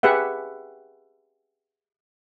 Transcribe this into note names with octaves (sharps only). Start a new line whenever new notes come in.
G4 G#4 B4 E5 F#5